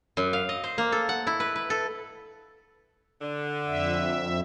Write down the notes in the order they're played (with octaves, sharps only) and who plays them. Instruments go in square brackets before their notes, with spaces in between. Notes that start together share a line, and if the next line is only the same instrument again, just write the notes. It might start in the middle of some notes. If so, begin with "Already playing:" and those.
[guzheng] F#2
F5
D#5
C5
A#3
A4
F#5
E4
B4
B4
A4
[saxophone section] D3
[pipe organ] F2 E5